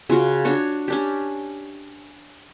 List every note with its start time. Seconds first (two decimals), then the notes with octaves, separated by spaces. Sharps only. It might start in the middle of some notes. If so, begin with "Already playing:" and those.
0.10 C#3 F4 F#4
0.45 D4 F#4 C#5
0.88 C#4 D4 G4